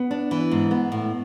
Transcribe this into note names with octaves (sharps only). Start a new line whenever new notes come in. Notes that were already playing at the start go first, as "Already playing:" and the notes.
Already playing: B3
D4
E3
G#2
B3
A2